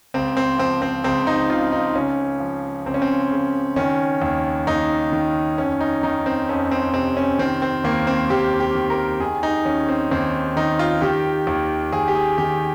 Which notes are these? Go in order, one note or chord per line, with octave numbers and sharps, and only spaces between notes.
C#2 C4
C4
F3 C4
C4
C#2 C4
D#4
C#3 F4
D#4
C#2 C#4
F3
C#2 C4
C#4
C4
C#3
D#3 C#4
D#2
D#2 D#4
D#3
F2 C#4
D#4
D#3 D#4
C4
F2 C#4
C4
C3 C4
C#4
D#3 C4
C4
D#2 A#3
C4
D#2 G4
G4
D#3
A#4
D#3 G#4
D#4
D#2 C#4
C4
D#2 C4
D#3 D#4
F4
D#3 G4
D#2
D#2 G#4
G4
G#4
D#3 G4